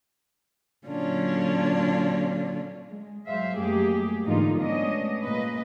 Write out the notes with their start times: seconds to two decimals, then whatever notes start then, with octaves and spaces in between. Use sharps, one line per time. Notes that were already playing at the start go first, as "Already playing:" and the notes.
0.86 A#2 D3 F#3 C#4 D4 F4
2.91 G#3
3.25 F#3 G#3 C5 E5 F5
3.57 F#2 G3 A3 A#3 G4 G#4
4.26 G#2 D3 E3 A#3 D#4 F4
4.58 G#3 A3 B3 C#4 D4 D#5
5.23 A#2 G#3 A#3 B4 D#5